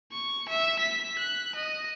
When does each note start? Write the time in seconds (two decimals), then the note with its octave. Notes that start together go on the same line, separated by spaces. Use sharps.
0.12 C#6
0.49 E5
0.79 B6
1.19 F#6
1.55 D#5